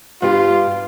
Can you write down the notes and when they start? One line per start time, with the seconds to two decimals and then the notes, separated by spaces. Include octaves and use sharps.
0.22 G2 F4 G4